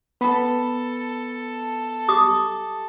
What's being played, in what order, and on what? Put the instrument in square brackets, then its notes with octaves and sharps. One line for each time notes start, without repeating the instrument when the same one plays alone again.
[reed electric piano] B3 B5 [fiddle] A4
[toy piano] G4 D6 D#6